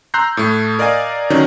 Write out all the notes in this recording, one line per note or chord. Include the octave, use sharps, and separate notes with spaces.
A#5 C6 E6 F#6 G6 C7
A2 A3
A#4 D5 D#5 F5 G#5
D3 D#3 F#3 C#4 D#4